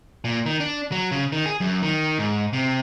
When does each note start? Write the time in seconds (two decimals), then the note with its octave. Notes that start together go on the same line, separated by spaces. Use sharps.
0.25 A#2
0.46 D#3
0.60 D4
0.92 F#3
1.12 C#3
1.32 D#3
1.46 G#4
1.61 F#2
1.82 D#3
2.19 G#2
2.53 C3